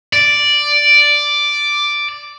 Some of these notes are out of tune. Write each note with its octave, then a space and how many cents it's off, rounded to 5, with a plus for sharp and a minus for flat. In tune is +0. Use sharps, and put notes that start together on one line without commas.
D5 +0